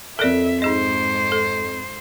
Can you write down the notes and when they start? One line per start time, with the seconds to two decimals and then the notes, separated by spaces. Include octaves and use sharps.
0.19 F2 A4 A#4 D5 E5 D7
0.62 G#2 D#4 G#4 C5 D#5
1.32 A4